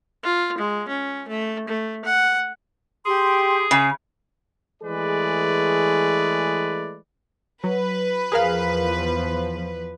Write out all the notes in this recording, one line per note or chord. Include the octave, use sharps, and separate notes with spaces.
F4
G#3
C#4
A3
A3
F#5
G4 G#4 C6
C#3
E3 G#3 A3 G#4 B4 D5
F#3 B4
E2 F3 G#4 A#4 F5